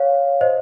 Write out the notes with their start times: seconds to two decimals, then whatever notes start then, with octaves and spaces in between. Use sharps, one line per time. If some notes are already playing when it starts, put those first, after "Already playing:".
Already playing: C#5 F5
0.41 C5 D#5